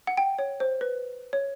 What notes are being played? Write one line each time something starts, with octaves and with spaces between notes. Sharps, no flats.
F#5
G5
C#5
C5
B4
C#5